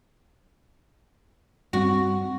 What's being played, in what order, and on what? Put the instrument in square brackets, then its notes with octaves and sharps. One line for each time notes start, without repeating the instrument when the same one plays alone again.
[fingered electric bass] G2 G3 C4 [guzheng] F#4